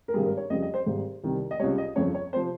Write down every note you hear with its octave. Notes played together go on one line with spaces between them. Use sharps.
A#4
G#1 G2 G3 G#4
A#4
C#5
F2 C#3 G3 D#5
D#5
C5
G#1 G#2 G3
C2 C3 D#3 G3
D#5
C#2 C3 G3 C#5
D#5
G1 F2 C#3 C#5
C#5
C3 F3 C5